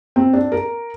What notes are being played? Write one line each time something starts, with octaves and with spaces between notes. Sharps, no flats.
C4
D4
A#4